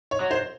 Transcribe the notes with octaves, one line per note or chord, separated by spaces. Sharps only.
C#5
F#3
C5